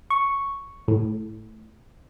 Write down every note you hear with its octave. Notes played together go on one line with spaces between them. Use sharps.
C#6
A2